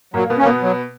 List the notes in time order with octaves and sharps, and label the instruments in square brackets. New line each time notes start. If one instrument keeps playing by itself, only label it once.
[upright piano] A#2 A#3 [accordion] F#3
[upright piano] A#3
B2 B3
[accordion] A#3 C#4
[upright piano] B2 B3
[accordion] F#3